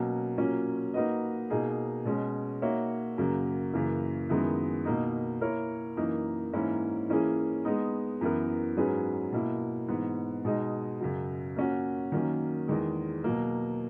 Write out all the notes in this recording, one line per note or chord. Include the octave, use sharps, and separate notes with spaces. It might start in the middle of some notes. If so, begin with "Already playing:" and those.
Already playing: B2 F#3 A#3 C#4
A#2 F#3 A#3 C#4
A#3 D#4 F#4 B4 D#5
B2 A#3 D#4 G#4
B2 G#3 C#4
A#3 D#4 F#4 C#5 E5
F#2 C#3 F#3 A#3
F#2 C#3 E3 A#3
F#2 D#3 G#3 B3 E4
B2 A#3 D#4
A#3 E4 A#4 C#5
F#2 E3 A#3 D#4
G#2 E3 A#3 C#4 E4
E3 A#3 C#4 E4 G#4
G#3 B3 D#4
F#2 E3 B3 E4 A#4
G#2 F#3 C#4 G#4 B4
B2 A#3 E4
G#2 E3 B3
B2 G#3 D#4
F#2 C#3 F#3
A#3 C#4 F#4
D#3 F#3 A#3 C#4
E2 D#3 G#3
B2 F#3 A#3